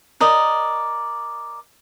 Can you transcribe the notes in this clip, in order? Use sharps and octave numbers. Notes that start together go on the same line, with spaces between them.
A#4 D5 D#5